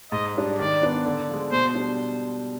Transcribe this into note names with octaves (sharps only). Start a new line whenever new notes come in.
G#2 D#5
G3 D4
D#3 D5
B3 D4
D3
F3 G#3
B2 C5
G3 D4